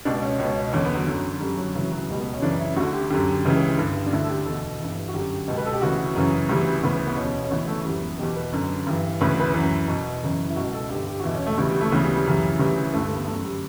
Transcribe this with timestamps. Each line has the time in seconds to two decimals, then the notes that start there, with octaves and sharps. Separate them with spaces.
0.05 C#2 B2 D4
0.22 C#4
0.39 C#2 B2
0.73 E2 D3 C#4
0.85 B3
0.95 F#3
1.07 F#2 D3
1.40 F#2 D3 G3
1.57 F#3
1.75 D2 C#3 E3 F#3
1.91 F#3
2.09 C#2 B2 G3
2.20 B3
2.34 C#4
2.42 F#2 C#3 E3 D4
2.59 E4
2.76 D2 D3 F#4
2.93 G4
3.10 F#2 D3 G4
3.45 C#2 C#3 E3
3.78 G2 D3
4.06 D4
4.13 D2 D3 E4
4.24 A4
4.29 G4
4.45 E2 B2 A4
4.80 G2 E3
5.08 F#4
5.14 F#2 D3 G4
5.48 C#2 B2
5.58 B4
5.65 A4
5.73 G4
5.82 D2 C#3 E3 F#4
6.15 F#2 C#3 E3
6.49 D2 C#3 E3 G3
6.83 D2 C#3 E3 B3
7.07 B3
7.16 E2 B2 C#4
7.43 C#4
7.51 D2 C#3 E3 B3
7.67 A3
7.85 F#2 E3 G3
8.01 B3
8.19 E2 B2 G4
8.36 B4
8.53 F#2 D3
8.87 G2 E3
9.21 D2 C#3 E3 B4
9.40 B4
9.54 F#2 E3
9.88 E2 B2
10.23 F#2 C#3 E3
10.48 E4
10.56 C#2 B2 F#4
10.74 A4
10.90 G2 D3 G4
11.07 G4
11.20 F#4
11.24 E2 B2 E4
11.35 C#4
11.47 A3
11.58 D2 C#3 E3 G3
11.69 G3
11.81 A3
11.92 D2 C#3 E3 B3
12.02 G3
12.14 G3
12.26 F#2 C#3 E3
12.59 D2 C#3 E3 G3
12.93 G2 A3
12.97 D3
13.05 A3
13.15 B3
13.27 F#2 D3 A3
13.44 G3